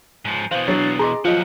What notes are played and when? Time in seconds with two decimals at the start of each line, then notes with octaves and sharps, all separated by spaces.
0.25 G#2 F3
0.51 B2 E3 C5 F5
0.68 F#3 D4 A6 C7
0.99 G#4 D#5 A#5 C6 D6
1.25 D#2 F3 F#3 F4 D#5